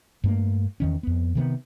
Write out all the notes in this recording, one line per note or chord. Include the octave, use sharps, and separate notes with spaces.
G2 A3 A#3
E2 D#3 C#4
F2 B3
C3 D#3 A#3 B3